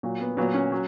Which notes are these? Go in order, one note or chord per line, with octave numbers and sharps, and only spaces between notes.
A#2 F#3
B3
A#2 F#3 B3
C#4
F#3